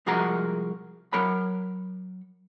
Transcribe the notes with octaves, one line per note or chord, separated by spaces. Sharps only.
C2 F3 G#3 F#4 A#4 A#5
F#3 A#4 C#5 B5